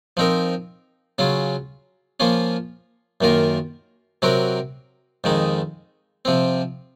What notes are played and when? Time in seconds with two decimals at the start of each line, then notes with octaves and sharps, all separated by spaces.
0.17 F3 C4 D#4 A#4
1.18 C#3 F#3 C#4 F4
2.20 F3 A#3 C#4 F4
3.21 F#2 D#3 A#3 F4 A#4
4.22 C3 F#3 C4 F#4 A#4
5.24 F2 D#3 G#3 D#4
6.25 C3 F3 C4